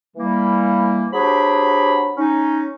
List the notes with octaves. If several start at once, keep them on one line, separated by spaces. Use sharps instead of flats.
E3 G3 A#3
F#3 C4 D4 G4 G#4 B5
C#4 D#4